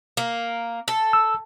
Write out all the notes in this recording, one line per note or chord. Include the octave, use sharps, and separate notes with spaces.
A#3
A4
E6